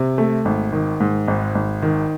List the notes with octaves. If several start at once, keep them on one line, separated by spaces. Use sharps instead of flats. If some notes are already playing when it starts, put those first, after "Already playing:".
Already playing: C3
A3
G#1
D#3
G#2
G#1
G#1
D#3